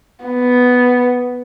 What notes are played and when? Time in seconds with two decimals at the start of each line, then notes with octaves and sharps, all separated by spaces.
0.25 B3